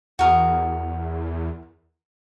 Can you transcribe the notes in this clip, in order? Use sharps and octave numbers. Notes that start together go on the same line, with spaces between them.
E2 F#4 A#4 D#6